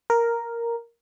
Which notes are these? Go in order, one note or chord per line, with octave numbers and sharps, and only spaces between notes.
A#4